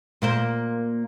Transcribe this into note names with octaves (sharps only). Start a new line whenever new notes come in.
A#2 A#3 C5